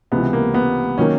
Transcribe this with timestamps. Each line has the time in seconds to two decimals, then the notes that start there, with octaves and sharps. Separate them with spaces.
0.12 C#2 C3 E3 B3
0.33 A#3
0.54 B3
0.98 D#3 F#3 A#3 C#4